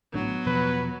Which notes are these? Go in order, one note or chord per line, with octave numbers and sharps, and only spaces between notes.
G#1 A2 F#3 B3 D4
E1 B2 F3 B4